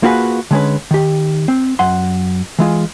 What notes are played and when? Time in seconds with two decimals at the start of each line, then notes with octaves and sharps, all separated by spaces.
0.03 A#3 F4 F#4 G#4 B4
0.51 D3 G#3 C#4 B4
0.91 D#3 G4
1.48 C4
1.79 F#2 F#5 C6
2.59 E3 G#3 F4